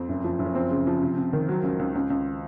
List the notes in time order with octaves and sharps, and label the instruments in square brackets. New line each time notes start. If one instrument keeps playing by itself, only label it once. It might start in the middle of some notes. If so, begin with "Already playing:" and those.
Already playing: [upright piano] F2 C4
F#1
F3
F#1
C#4
F3 C4
C#3
F3
C3
C3
D#3
F#3
C#2
C#2
C#2
C#2